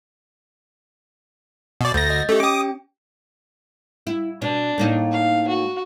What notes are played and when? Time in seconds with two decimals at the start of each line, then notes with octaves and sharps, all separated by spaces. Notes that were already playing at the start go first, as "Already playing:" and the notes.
1.81 B2 D5
1.94 D2 G6 A6 A#6
2.10 D#5
2.29 A3 C#4 G4
2.40 C#4 G5 D6 D#6
4.07 E4
4.42 B2 D4
4.78 A2 A#3 D#4
5.12 F5
5.48 F#4